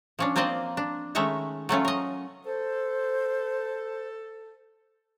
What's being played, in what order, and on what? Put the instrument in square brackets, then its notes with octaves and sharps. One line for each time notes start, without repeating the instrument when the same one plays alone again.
[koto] F3 C#4 D4
A#3 C4 F4 C5 D5 D#5
D4
D#3 G#3 A3 C#4 E5 A#5
F#3 A3 C#4 F4
A#4 D#5
[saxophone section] A4 [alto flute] C5